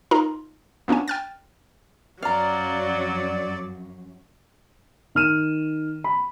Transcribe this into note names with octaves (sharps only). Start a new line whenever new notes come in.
D#4 F4 A#4 A#5 C6
A#3 B3 C#4 D4 G#5
G5 F6 A6
F#2 F#3 D5 F5 A#5
D#3 F6 D#7 E7
B5